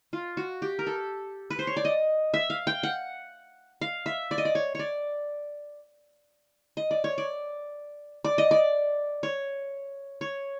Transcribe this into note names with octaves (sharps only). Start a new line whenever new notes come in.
F4
F#4
G4
A#4
A4
B4
C5
C#5
D5
D#5
E5
F5
G5
F#5
F5
E5
D5
D#5
D5
C#5
C#5 D5
D#5
D5
C#5
D5
D5
D#5
D5
C#5
C#5